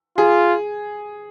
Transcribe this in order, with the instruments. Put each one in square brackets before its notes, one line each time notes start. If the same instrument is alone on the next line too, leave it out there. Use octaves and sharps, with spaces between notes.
[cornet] F4 [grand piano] G#4